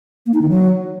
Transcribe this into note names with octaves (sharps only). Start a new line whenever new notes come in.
A#3
D#4
D#3
F#3